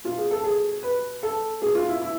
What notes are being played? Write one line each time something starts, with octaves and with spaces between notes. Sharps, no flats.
B2 F4
G#4
A4
G#4
B4
A4
B2 G#4
F4
E4
E4